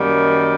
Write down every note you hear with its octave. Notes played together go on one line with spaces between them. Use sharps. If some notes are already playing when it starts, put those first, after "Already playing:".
Already playing: F#2 D#3 G3 A#3